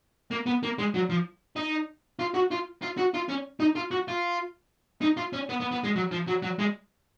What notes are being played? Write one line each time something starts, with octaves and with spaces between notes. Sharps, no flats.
A#3
B3
A#3
G#3
F#3
F3
D#4
F4
F#4
F4
F4
F#4
F4
C#4
D#4
F4
F#4
F4
D#4
F4
C#4
B3
B3
B3
G#3
F#3
F3
F#3
F#3
G#3